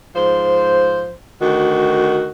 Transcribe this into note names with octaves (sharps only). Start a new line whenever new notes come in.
G#2 F3 C5
D2 D#3 F#4